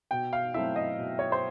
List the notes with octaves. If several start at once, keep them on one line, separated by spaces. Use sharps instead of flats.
B2 G5
F5
F#3 A3 C4 E4 E5
D#5
B2
C#5
C5